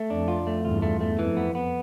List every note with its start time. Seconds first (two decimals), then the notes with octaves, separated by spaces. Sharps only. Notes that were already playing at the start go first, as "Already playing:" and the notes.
Already playing: A3
0.10 F2 D4
0.28 F4
0.47 A3
0.65 E2 G2 F4
0.82 A3
1.01 A3
1.19 F2 E3
1.37 B3
1.55 B3